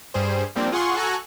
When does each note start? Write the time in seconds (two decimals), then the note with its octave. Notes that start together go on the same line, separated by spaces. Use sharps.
0.14 G2 G3 G#4 C5
0.56 F3 G3 A#3 C4 D4
0.72 F4 G#4 F#5 C6 C#6
0.96 F#4 A4 G#5 A#5 C#6 F#6